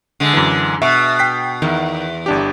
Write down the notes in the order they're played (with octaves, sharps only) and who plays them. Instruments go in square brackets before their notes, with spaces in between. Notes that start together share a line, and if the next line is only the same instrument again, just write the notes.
[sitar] D3 G#3
[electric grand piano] F#2 E3
[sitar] B2 [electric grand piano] E5 C#6
[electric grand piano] G5 B6 C7
[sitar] E2 [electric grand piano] D#3
[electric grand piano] G1 D4 G4